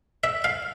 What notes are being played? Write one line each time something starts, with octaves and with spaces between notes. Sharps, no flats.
E5
F5